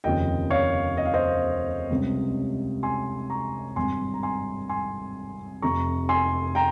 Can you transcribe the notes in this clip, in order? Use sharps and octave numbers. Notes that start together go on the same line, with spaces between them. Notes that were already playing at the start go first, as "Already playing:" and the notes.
F1 D#2 C#3 F3 D#5 G5
C#5 F5
D#5
F5
C5 D#5
C#2 C3 G3
G#5 C6
A#5 C#6
G#1 G2 G3 G#5 C6
A#5
G#5 C6
G#5 C6
F1 F2 C3 A#5 C#6
G#5 C6
G5 A#5